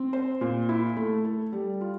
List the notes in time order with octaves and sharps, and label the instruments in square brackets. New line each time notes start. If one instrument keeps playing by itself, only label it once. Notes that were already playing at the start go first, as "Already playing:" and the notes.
Already playing: [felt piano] C4
C5
A#2
E4
A3
A4
G3
F4